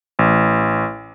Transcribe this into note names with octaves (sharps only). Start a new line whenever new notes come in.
A1